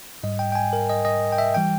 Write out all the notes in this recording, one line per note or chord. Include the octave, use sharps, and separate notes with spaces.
G#2 G3 D#5
G5
G5
G#5
A#4
D#5
D#5
G5
E5
E3 G3 G5